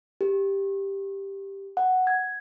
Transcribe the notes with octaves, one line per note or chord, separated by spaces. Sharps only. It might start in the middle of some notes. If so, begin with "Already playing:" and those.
G4
F#5
G#6